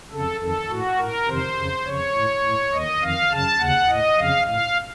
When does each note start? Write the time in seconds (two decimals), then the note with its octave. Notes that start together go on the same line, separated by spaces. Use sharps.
0.11 F2 C#3 A4
0.41 F2 D#3 A4
0.70 A2 F#4
0.99 A2 A#4
1.28 F2 C3 D#3 C5
1.57 F2 C#3
1.86 F2 C#3 C#5
2.15 A2
2.44 A2
2.73 D#2 D#3 D#5
3.02 F2 D#3 F5
3.31 F#2 C#3 A5
3.60 D#2 C#3 F#5
3.89 A2 D#5
4.18 F2 C#3 F5
4.47 A2 F5